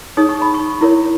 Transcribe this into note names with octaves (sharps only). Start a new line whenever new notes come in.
D#4 G#4 C#5 D#6
C#6
B5
C#6
E4 A#4 C#5